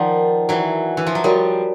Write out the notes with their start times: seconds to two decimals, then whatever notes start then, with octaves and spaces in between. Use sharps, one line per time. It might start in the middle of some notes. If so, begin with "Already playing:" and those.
Already playing: D#3 F3 A#4 D5 F#5
0.49 E3 F#3
0.97 E3
1.07 F3
1.15 F#3
1.24 F3 G3 F#4 A#4 C#5